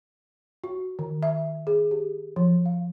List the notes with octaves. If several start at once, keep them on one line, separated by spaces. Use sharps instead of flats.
F#4
D#3
E5
G#4
G4
F3
F5